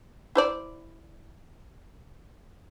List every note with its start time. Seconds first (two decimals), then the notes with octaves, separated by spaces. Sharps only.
0.35 E4 C5 D5